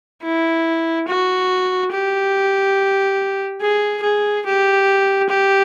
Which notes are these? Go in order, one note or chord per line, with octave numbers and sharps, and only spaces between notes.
E4
F#4
G4
G#4
G#4
G4
G4